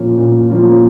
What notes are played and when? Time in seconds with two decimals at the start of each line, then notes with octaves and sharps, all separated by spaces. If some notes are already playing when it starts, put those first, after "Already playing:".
Already playing: A#2 F3 A#3 C#4 F4
0.18 A#2
0.50 F3 A#3 C#4 F4